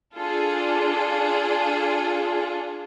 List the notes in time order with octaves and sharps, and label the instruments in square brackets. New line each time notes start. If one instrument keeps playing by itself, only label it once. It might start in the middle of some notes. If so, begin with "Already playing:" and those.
[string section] D4 F4 G#4 A4